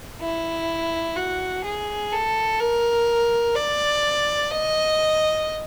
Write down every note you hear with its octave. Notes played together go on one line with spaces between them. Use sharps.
E4
F#4
G#4
A4
A#4
D5
D#5